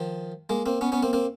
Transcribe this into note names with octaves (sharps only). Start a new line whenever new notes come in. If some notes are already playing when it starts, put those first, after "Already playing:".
Already playing: D#3 F3
G#3 A#3
A#3 C4
B3 C#4
B3 C#4
A#3 C4
A#3 C4